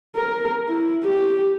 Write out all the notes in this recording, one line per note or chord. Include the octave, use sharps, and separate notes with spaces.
A#4
E4
G4